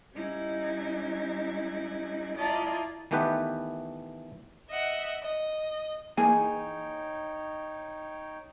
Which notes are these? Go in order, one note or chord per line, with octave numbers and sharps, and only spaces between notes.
G3 C#4 D#4 E4
E4 F4 D5 D#5 A5 A#5
D#3 E3 A3 B3 G4 B4
D#5 E5 F#5
D#5
E3 A#3 D#4 G#4 C#5 G5 G#5